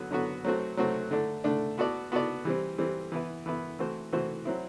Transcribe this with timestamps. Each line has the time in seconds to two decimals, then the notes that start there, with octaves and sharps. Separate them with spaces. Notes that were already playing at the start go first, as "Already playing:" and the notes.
Already playing: D3 F#3 B3 F#4
0.11 D3 F#3 B3 F#4
0.45 F#3 A3 C4 F#4
0.77 F#3 A3 C4 F#4
1.11 D3 A3 D4
1.44 D3 A3 D4
1.78 B3 F#4 A4 D5
2.12 B3 F#4 A4 D5
2.45 E3 G3 C4
2.78 E3 G3 C4
3.12 E3 B3 E4 B4
3.46 E3 B3 E4 B4
3.79 E3 A3 C4 F#4 C5
4.12 E3 A3 C4 F#4 C5
4.45 F#3 C4 E4